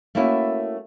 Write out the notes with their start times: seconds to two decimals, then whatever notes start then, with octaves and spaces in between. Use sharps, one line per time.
0.15 A3 A#3 C#4 E4 F#4